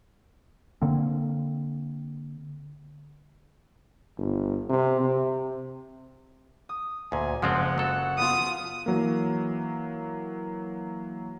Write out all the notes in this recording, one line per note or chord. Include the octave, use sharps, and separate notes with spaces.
D3 A#3 C4
G1
C3
C3
D#6
D2 A#2 G#5
F#1 F3 G#3 C4 F#5
F#3 A4
B3 F4 D#6
E3 F#3 A#3